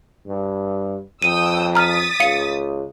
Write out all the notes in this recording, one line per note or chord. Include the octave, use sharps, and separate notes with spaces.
G2
F2 G5 D#6 E6 D#7
A#5 D#6 F6 A6 B6
C#2 F5 C#7